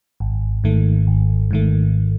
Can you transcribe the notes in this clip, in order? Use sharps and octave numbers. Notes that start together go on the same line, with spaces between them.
G#1
G#2 D#3 A3
G#1
G#2 D#3 A3